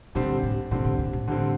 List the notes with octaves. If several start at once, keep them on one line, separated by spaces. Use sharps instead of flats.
A#2 D3 G3 C4
A2
A#2 D3 G3 C4
A#2
A2
A#2
A2
D3 G3 C4